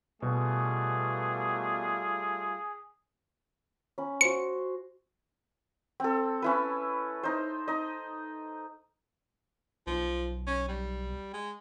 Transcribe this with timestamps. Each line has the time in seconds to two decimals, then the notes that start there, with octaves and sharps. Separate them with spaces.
0.22 B2 G3 A3 F4 G#4
3.98 C#4 B5
4.21 F#4 C5 C#7
6.00 C4 A4
6.42 C#4 E4 B4
7.23 D#4 C5
7.68 D#4 D#5
9.87 B1 F3
10.47 C#4
10.68 G3
11.33 G#3